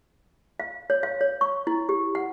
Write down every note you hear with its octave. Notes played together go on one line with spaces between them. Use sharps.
F5
C#5
F5
C#5
C#6
E4
G4
F#5